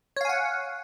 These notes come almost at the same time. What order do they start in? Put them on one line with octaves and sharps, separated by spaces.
C#5 F5 G#5 F#5